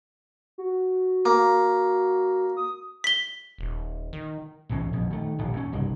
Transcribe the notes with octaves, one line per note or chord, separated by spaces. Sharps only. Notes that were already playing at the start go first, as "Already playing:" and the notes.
F#4
A#3
D#6
B6 G7
D#1
D#3
B1 E2 A2 C#4
A#1 F2 B2
D#3 A3
D#1 A#1 A2
E2 C#4
F#1 C2 G2 D#3